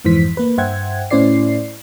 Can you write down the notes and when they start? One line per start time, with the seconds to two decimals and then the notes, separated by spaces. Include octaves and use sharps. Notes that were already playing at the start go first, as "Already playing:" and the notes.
0.05 F2 G#2 E3 C5 B6
0.37 A#3 B4
0.58 G2 C5 E5 F#5 G5 G#6
1.11 A2 C#4 E4 C5 D5 C7